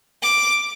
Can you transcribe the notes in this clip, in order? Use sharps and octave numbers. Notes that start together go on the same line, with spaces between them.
D6